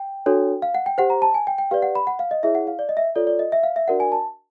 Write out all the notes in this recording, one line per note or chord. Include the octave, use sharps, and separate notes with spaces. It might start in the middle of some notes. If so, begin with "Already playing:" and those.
Already playing: G5
D4 F#4 A4 C#5
F5
F#5
G5
G4 C5 F#5
A#5
A5
G#5
G5
G5
G4 B4 D5 F5
F#5
B5
F#5
F5
D#5
E4 G#4 C#5 E5
F#5
F5
D5
D#5
E5
F4 A4 C#5 D5
D5
D#5
E5
F5
E5
D4 F#4 A#4 D5 F#5
G#5
A5